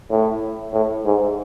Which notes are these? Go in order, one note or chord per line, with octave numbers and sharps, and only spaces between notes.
A2
A2
G#2